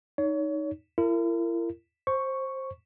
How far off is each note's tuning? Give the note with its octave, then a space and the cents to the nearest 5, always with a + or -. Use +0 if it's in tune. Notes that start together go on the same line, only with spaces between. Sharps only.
D#4 +0 C#5 +30
E4 +40 A#4 -30
C5 +15 C#6 +0